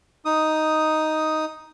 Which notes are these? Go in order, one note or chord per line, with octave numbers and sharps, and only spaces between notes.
D#4 D#6